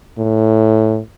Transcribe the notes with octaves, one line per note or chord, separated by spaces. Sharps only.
A2